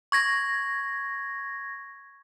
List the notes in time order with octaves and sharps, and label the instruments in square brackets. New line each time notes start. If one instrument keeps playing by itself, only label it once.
[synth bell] C#6 G#6 A#6